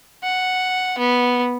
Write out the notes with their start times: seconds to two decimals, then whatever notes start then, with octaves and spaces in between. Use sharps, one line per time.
0.24 F#5
0.98 B3